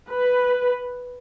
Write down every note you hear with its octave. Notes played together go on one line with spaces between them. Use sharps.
B4